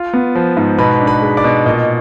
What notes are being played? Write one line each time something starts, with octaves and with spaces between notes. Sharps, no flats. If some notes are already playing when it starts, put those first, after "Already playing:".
Already playing: F4
B3
F3
G#2
B2 B4 B5
D4
B4 B5
G#3
D5 D6
B2
A#2 D#5